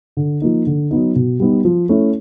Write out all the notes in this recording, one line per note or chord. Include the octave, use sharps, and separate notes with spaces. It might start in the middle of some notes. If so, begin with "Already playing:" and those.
D3
F3 A#3 D#4
D3
F#3 B3 D#4
B2
G3 B3 D#4
F3
A3 C#4 E4